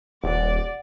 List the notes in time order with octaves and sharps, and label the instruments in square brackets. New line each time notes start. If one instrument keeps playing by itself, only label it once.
[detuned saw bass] D#1 [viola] D5 [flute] F#5